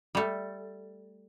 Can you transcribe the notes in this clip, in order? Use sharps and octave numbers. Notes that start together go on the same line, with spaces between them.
G3 A3